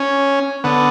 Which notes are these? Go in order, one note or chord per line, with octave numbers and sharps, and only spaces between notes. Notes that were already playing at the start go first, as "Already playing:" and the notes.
Already playing: C#4
D3 B3